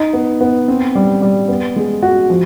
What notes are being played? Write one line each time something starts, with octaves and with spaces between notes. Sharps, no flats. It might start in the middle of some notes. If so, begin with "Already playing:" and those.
Already playing: D#4
B3
B3
C4
G3
G3
B3
G#3
F#4
F3